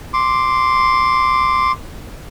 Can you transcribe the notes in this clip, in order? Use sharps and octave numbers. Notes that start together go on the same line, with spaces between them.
C6 D6